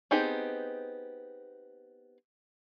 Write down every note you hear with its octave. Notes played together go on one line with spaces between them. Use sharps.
B3 C4 D#4 G4 G#4